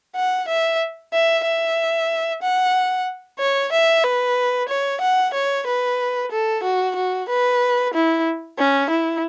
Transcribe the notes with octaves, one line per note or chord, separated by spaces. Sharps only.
F#5
E5
E5
E5
F#5
C#5
E5
B4
C#5
F#5
C#5
B4
A4
F#4
F#4
B4
E4
C#4
E4